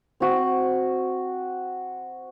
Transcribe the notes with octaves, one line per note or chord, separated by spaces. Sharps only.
C4 F#4